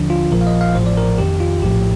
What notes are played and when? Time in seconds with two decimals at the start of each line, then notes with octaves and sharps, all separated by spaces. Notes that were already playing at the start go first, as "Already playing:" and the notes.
Already playing: D#2 D3 F3 D4
0.10 F4
0.32 A#1 A#2 F3 A#4
0.41 F5
0.47 D#5
0.61 F5
0.75 A1 A2 F3 C5
0.86 D5
0.97 A#4
1.18 F2 D#3 G4
1.40 F4
1.62 A#1 A2 F3 G4